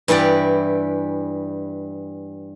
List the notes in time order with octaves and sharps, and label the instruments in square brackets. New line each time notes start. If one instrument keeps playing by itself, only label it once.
[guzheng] G2 E3 E4 G4 D5